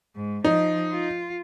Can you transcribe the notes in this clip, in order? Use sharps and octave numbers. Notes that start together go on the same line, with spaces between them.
G#2
F3 D#4
F4